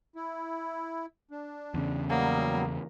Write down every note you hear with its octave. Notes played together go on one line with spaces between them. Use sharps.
E4
D4
E2 C#3
F#3 G3 A#3 B3